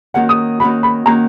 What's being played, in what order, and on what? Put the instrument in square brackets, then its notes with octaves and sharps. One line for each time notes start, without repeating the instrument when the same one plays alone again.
[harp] D#3 A#3 C#4 F#4 [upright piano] F#5
[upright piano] D#6
[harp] D#3 A#3 C#4 F#4 [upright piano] B5
[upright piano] B5
[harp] D#3 A#3 C#4 F#4 [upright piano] A#5